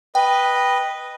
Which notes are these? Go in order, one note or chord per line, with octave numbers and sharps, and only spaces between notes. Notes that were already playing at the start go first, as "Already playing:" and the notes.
B4 D#5 G5